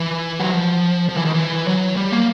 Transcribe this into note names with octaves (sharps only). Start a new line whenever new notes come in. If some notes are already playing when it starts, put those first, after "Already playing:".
Already playing: E3
F#3
F3
F3
E3
D#3
E3
F#3
G3
A#3